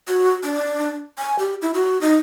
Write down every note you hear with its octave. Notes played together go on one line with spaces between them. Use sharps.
F#4
D4
G#5
G4
E4
F#4
D#4